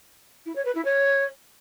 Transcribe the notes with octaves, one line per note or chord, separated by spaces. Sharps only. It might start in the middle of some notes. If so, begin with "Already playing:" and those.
E4
C#5
B4
E4
C#5